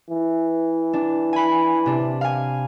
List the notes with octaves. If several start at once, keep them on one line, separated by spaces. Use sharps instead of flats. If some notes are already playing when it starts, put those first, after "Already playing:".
E3
D4
G#5 B5
C3 D4
F5 G#5